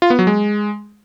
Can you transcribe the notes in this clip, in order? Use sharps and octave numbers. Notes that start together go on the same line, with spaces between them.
F4
B3
F#3
G#3